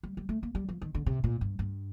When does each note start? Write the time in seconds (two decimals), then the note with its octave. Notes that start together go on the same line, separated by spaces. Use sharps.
0.03 G3
0.17 G3
0.29 A3
0.43 A#3
0.55 G3
0.69 F3
0.82 D#3
0.95 D3
1.06 C3
1.24 A#2
1.41 G2
1.59 G2